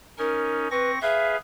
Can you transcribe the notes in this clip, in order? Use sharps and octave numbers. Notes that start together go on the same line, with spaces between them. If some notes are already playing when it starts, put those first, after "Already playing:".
C#4 D#4 A#4
C4 B4 C#6 A#6
G#4 B4 E5 F5